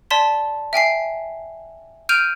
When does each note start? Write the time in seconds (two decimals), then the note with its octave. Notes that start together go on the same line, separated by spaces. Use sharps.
0.11 D5 A5 C6 B6 G7
0.73 E5 G5 G#5 C7
2.09 F6 G6 D7 D#7 F7